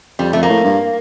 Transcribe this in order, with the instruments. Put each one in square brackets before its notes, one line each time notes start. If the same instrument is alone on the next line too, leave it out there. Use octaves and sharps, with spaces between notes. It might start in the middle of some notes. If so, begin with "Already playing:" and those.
[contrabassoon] F2 [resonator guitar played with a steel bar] G3
[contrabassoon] F2 [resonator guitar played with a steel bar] A3
[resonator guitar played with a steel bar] A#3
[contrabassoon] A2
G2